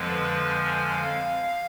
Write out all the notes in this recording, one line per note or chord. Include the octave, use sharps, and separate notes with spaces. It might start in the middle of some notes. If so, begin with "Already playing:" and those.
Already playing: F2 D3 F3 G#3 B4
G#5
F5